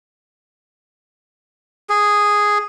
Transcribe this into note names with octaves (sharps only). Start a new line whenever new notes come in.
G#4